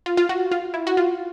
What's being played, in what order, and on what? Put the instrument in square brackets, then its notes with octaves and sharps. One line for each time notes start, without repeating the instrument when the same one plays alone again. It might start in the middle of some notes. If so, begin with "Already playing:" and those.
[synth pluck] F4
F4
F#4
F4
E4
F#4
F4